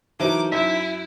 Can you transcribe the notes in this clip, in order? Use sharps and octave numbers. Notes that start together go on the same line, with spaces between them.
E3 F#3 D#4 A#4 C5 A5 D6
F#2 E4 E5